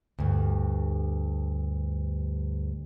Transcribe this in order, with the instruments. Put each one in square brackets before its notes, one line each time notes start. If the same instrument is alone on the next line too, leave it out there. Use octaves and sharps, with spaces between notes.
[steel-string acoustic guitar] D2 G2